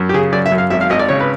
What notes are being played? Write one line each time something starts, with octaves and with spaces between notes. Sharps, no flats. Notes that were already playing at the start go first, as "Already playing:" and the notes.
Already playing: F#2
G4
C#3 G#4
F#2 D5
E5
F#2
F5
G#1 E5
F5
G#1 D#5
D5
C#3 C#5
B4